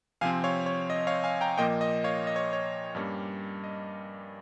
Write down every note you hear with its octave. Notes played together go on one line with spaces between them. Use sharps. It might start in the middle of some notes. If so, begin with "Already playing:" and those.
C3 F3 C4 F5 G#5
C#5 F5
C#5
D#5
C#5 F5
F5 G#5
G5 A#5
A#2 F3 A#3 D#5 G5
D#5
C#5 F5
D#5
C#5
C#5
G2 G3 A#3 C#4
D#5